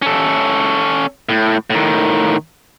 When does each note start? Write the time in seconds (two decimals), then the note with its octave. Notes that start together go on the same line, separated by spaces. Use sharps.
0.02 C#4 A4
1.29 A2
1.70 A2 D#3